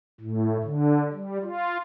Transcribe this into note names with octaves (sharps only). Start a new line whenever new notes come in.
A2
D3
G3
F4